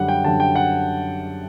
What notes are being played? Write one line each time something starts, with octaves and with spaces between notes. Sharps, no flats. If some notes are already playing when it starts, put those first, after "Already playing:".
Already playing: F#2 D3 G3 F#5
G5
F#2 D3 G3 A5
G5
F#5